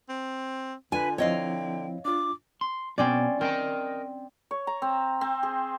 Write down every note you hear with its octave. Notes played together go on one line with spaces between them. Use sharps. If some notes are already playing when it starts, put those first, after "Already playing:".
C4
D3 D4 F4 B4 G#5
F3 C4 E4 C#5 D#5 F5 G5
D4 F4 D6
C6
B2 C4 C#4 D5
C4 A#4 D#5 G5
C#5
A#5
C4
C4
G#4